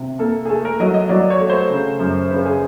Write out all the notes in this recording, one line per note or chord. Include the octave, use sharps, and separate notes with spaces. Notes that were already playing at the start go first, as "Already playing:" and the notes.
Already playing: C3
A#3 A4
G#4
A3 A4
A#4
F#3 D#5
D#5
F#3 D5
C#5
A3
C5
C#3
F#2
C#3 B4
G#4